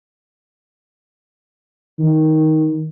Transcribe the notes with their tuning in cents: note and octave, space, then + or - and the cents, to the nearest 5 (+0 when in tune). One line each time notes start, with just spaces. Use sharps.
D#3 +10